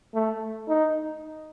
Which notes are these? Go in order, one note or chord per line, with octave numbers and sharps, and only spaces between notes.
A3
D#4